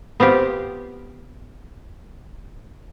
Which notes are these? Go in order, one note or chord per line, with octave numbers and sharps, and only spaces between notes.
B3 C4 F4 G4